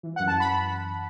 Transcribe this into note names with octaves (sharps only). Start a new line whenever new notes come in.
E3
F#2 F#5
A5
B5